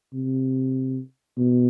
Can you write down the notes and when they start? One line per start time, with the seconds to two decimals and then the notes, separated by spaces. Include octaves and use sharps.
0.14 C3
1.38 B2